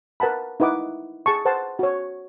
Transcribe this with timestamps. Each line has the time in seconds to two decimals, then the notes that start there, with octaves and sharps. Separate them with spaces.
0.20 A#4 B4 F#5 A5 B5
0.60 D#4 E4 B4 F#5 D6 D#6
1.26 G#4 A5 C#6
1.45 B4 C5 F#5 A5 C6
1.79 F#4 C#5